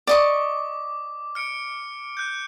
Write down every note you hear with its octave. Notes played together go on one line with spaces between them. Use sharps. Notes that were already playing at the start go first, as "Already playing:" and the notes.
D5 D#5 C#6 D6
F6 C#7 D7
F#6 G6